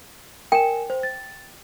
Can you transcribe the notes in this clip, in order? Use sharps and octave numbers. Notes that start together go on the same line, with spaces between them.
A#4 G5 G#5 E7
C5
A6